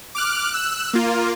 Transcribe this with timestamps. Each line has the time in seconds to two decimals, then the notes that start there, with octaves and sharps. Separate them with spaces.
0.15 D6 F6 F#6
0.51 E6 F#6
0.93 A#3 F4